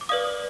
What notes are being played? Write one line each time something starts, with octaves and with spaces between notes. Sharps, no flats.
D6
B4 D5 F5 D#6